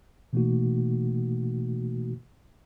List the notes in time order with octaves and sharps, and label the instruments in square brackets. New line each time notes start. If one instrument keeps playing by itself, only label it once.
[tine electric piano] B2 E3 A3 A#3 D#4 F#4